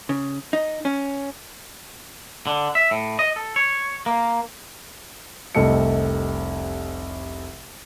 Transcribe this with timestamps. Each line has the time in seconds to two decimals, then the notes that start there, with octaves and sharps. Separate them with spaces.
0.09 C#3
0.53 D#4
0.85 C#4
2.47 D3
2.75 E5
2.91 A2
3.19 D#5
3.36 A4
3.56 C#5
4.06 A#3
5.55 F1 C2 C3 A4 D#5 C#7